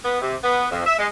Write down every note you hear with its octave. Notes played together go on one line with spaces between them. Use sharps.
B3
C3
B3
F2
E5
G#3